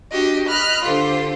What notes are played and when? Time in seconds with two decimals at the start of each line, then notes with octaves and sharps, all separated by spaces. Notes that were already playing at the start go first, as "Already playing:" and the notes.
0.12 D4 F#4 G4 D#5
0.49 D#5 B5 F6 F#6
0.84 D3 F4 G4 A4 C5